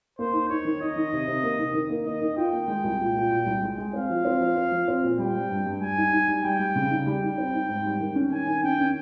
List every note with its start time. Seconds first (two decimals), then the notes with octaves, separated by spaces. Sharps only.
0.19 A#3 C5
0.33 D#4
0.49 D#4 C#5
0.65 D#3
0.81 D#4 D#5
0.96 D#3
1.13 C3
1.27 C3
1.43 A#3
1.59 D#3
1.74 D#3
1.90 A#3
2.05 A#3 D#5
2.21 D#3
2.37 F4 G5
2.53 A#3
2.68 G#3
2.84 C2
3.00 A#2
3.16 A#2
3.31 A#2
3.46 C2
3.62 G#3
3.78 G#3
3.93 C4 F5
4.09 F3
4.25 C4
4.41 F3
4.56 C4
4.72 F3
4.88 C4
5.04 A#2
5.18 G3 G5
5.35 G3
5.49 G2
5.66 G2
5.81 G3 G#5
5.97 D#4
6.13 D#4
6.28 G3
6.44 G3 G5
6.59 G3
6.76 C#3
6.91 D#4
7.06 G3 G5
7.22 D#4
7.38 C4
7.53 D#4
7.69 G#2
7.85 G3
8.00 D#3
8.15 C#4
8.31 D#3 G#5
8.47 D#3
8.63 C#4 G5
8.78 C#4